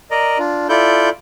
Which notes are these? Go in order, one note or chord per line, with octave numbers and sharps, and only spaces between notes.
A#4 D5 D#5 A#5
D4 F4
E4 F4 A4 D5 G6